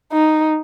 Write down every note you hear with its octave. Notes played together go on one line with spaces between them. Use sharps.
D#4